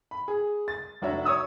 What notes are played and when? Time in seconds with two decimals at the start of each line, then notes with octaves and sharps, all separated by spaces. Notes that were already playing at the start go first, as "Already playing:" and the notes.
0.11 B5
0.28 G#4
0.68 A6
1.02 F1 D4 F#4 C#5 E5
1.25 C#5 C#6 D#6 E6